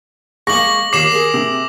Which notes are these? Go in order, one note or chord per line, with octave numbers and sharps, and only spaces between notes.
G#3 A#3 C#6 D6 A#6 F#7
D#2 F4 C#5 D6 C7 E7
G#4 A#4
C3